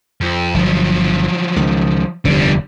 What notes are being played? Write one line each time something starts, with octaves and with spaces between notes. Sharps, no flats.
F2
G1 F3 F#3
C#2 D#3
F1 D#2 D3 G3